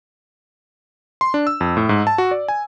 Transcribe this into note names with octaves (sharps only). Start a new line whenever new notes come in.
C6
D4
E6
F2
A2
G#2
A5
F#4
D5
G#5